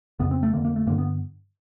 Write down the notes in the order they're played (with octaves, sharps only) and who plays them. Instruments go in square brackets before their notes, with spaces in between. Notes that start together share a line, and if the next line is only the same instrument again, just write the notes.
[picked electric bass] F2 C#3 B3
C4
A3
F2 D3 A#3
A#3
A3
G2 D3 A#3
B3